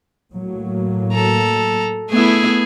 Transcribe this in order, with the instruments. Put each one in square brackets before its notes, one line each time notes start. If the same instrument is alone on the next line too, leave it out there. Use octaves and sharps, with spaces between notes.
[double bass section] A2 F#3 A#3
[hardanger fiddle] A4 A#5
[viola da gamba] A3 B3 E4 [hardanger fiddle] G#4